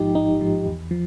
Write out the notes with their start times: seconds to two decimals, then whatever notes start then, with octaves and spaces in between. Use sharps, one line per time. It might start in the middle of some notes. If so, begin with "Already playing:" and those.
Already playing: A1 G#2 F3 D#4 G4
0.15 A1 D#4
0.41 G#2 F3
0.66 E2
0.91 F3